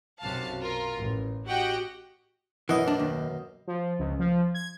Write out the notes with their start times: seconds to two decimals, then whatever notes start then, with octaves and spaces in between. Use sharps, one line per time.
0.21 B1 F#2 C3 F#4 F5 A5
0.61 F4 A#4
0.97 A1
1.46 F#4 G4 D#5 F#5 G5
2.69 F#2 B2 E3 D#5
2.88 D4
2.99 D#2
3.67 F3
3.99 C#2
4.19 F3
4.54 G#6